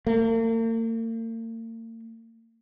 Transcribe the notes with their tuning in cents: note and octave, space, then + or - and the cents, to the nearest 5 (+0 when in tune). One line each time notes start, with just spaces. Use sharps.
A#3 -45